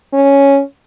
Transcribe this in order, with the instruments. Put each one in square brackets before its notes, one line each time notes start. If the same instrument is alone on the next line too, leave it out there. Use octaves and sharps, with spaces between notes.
[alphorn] C#4